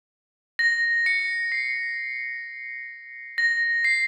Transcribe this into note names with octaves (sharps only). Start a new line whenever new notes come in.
A#6
C#7
C7
A#6
C7